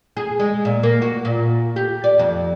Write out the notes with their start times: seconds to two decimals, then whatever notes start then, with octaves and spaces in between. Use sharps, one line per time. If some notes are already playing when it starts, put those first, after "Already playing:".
0.17 G#4
0.39 G#3
0.65 A#2
0.83 A#3
1.02 F#4
1.25 A#2
1.76 G4
2.04 D5
2.19 F2